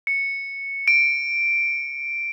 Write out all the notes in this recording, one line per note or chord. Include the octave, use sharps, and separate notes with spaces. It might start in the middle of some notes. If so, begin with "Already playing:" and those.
C#7
D7